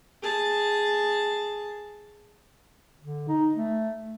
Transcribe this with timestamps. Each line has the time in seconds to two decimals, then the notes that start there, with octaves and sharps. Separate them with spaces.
0.23 G#4 A5
3.01 D3
3.28 D#4
3.56 A3